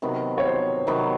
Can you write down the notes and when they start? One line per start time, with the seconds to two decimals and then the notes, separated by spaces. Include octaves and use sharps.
0.02 C3 D#3 F#3 B3
0.38 C#5
0.45 C5
0.87 C3 D#3 F#3 B3